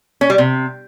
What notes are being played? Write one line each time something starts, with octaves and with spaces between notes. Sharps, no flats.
C#4
G3
C3